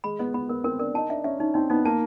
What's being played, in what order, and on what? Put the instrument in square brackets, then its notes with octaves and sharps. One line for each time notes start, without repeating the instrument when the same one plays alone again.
[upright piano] G#3 [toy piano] B5
[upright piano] B3 [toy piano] D#5
[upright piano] B3 [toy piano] B5
[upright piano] B3 [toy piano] A#4
[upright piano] C4 [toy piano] A#4
[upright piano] D4 [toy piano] A#4
[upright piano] D#4 [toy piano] A5
[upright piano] D4 [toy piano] E5
[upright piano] C#4 [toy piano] E5
[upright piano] C#4 [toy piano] D#4
[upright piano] C4 [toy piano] D#4
[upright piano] B3 [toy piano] D#4
[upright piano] A#3 [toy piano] A5